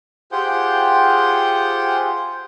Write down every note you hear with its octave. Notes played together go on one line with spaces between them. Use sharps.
F4 G4 G#4 C5 F#5 G5